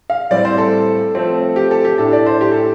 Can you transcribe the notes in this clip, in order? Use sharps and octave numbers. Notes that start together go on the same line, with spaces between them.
F5
A2 G3 C4 D5
C5
A4
F3 A3 C4
G4
A4
G4
A2 A3 D4 A4
D5
C5
G4
A4